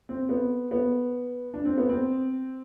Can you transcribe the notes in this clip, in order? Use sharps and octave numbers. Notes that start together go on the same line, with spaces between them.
C4
B3
B3
D4
C4
B3
C4